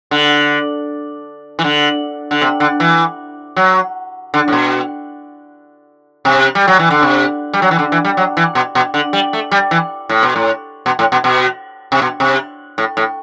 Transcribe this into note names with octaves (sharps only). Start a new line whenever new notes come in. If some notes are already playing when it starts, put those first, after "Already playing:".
D3
E3
D3
D3
C3
D3
E3
F#3
D3
A2
B2
C3
G3
F#3
E3
D3
C3
G3
F#3
E3
D3
E3
G3
F#3
E3
B2
B2
D3
G3
A3
G3
E3
A2
B2
A2
B2
A2
B2
B2
C3
B2
C3
A2
A2